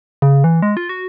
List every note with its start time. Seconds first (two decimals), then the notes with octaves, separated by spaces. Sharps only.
0.22 C#3
0.44 E3
0.62 G#3
0.77 F4
0.89 F#4